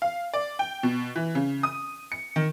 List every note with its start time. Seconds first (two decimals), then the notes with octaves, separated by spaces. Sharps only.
0.02 F5
0.34 D5
0.59 G5
0.83 B2
1.16 E3
1.35 C#3
1.63 D#6
2.12 C#7
2.36 D#3